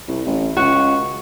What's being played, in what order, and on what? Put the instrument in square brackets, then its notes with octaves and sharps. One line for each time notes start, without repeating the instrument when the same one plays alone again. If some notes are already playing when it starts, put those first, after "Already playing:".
[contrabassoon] C2
A1
[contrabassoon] C#2 [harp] F#4